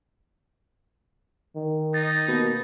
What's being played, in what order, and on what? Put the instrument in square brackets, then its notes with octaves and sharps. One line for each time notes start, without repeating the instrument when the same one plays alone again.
[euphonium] D#3
[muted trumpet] D#4 [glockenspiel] A6
[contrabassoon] B2 [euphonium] A#3